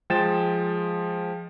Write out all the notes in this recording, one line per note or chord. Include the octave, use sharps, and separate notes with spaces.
F3 G#3 G5 A6 E7